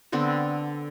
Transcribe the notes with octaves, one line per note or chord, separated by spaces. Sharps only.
D3 B3 C4 C5